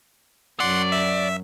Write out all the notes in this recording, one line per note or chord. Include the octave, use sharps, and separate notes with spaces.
F#2 F#3 D5 F#5 C6
E5